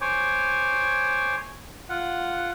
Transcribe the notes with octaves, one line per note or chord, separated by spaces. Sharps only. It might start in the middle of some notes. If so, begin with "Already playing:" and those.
C5 C#5 G#5 D6
F4 F#5